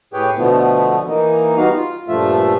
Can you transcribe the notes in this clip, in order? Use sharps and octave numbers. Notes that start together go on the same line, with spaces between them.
A2 G4 G#4 B4 C#5 G5
B2 D3 F3 A3 B3
E3 A#3 D#4
G3 B3 D#4 F#4 F5
F4
G2 A#2 F3 A3 F4 E5